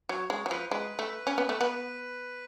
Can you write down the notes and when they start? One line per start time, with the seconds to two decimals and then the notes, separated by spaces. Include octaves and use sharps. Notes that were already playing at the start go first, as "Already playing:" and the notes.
0.09 F#3 C#5
0.30 G#3 C#5
0.46 F#3
0.51 F3 B4
0.71 G#3 B4
0.99 A3
1.27 C#4
1.38 B3
1.49 A3
1.61 B3